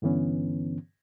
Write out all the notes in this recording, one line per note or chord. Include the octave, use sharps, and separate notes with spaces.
G2 D3 E3 B3 C#4